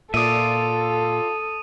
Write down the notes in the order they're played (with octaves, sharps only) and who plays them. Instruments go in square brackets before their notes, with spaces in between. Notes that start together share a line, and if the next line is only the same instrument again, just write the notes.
[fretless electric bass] A#2 [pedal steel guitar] F4 D5 E5 [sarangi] A4 [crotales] D#6 D#7